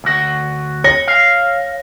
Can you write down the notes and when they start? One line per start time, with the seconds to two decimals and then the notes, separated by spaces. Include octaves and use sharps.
0.04 D2 F#4
0.84 C#5 A#6
1.08 F5